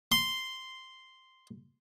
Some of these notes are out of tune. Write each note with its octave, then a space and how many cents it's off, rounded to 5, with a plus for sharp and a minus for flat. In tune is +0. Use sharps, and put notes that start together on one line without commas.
C6 -5